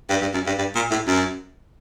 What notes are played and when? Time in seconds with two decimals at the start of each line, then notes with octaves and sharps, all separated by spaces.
0.10 G2
0.22 G2
0.33 F#2
0.47 G2
0.58 G2
0.75 A#2
0.91 A2
1.07 F#2